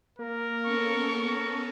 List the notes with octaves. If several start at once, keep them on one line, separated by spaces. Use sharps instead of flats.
A#3 A#4
B3 C#4 A4 C#6